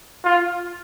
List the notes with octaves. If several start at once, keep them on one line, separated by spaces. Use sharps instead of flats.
F4